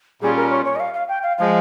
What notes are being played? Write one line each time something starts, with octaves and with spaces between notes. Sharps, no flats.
A#2 G3 C#4 F4 G#4
A#4
C#5
C#5
D#5
F5
F5
G5
F5
F3 G#3 F5